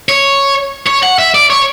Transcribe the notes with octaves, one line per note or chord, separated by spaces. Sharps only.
C#5
C#5
F#5
E5
D5
C#5